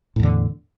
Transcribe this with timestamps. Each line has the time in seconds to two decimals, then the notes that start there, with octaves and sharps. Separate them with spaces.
0.16 A2
0.20 E2
0.23 D3